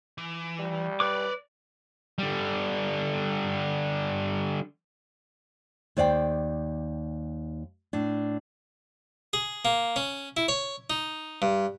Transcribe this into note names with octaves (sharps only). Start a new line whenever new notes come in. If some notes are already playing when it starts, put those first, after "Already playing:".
E3
G3
B4 C#5 D5 D6
D3 G3
D#2 C5 D5 F5 G5
A2 D4
G#4
A#3
C#4
E4
C#5
D#4
G2